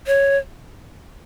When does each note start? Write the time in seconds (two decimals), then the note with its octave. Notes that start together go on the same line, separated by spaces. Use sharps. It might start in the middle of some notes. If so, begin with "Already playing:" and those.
0.07 C#5